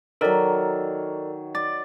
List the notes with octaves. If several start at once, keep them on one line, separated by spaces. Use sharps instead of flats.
D#3 F#3 A4 A#4 D5
D5 A6